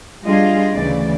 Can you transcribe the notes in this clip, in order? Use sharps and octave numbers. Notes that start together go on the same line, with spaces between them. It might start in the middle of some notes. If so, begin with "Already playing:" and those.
G3 D4 F4 G#4 D#5 F5
D2 C#3 E3 D5